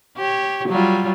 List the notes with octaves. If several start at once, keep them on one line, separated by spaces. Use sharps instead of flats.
G4 C#5
F#3 G3 F4